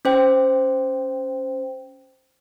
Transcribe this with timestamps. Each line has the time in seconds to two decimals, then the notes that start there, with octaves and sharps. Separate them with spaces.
0.05 C#4 C5 G5